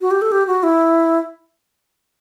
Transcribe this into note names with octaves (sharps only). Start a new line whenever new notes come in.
F#4
G4
A4
G4
F#4
E4